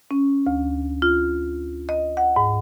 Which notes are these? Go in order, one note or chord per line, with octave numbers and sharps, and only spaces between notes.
C#4
D2
F4
D#5
F#5
G#2